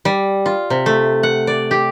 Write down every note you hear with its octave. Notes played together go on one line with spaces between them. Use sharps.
G3
F4
C3
A3
F#5
D5
G4